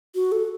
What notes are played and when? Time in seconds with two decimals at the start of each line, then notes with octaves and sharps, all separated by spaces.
0.15 F#4
0.32 A4